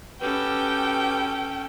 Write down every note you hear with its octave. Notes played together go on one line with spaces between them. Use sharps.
C#4 F#4 G4 A4 B4 G5